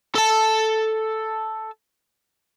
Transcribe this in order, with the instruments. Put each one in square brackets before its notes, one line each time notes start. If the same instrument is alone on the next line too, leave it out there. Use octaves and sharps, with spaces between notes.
[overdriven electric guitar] A4 A5